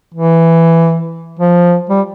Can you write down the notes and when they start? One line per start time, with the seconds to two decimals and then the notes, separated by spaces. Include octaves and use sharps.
0.14 E3
1.39 F3
1.89 G3